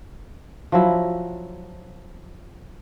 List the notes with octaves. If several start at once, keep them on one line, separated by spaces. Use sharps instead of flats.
F3 F#3 E4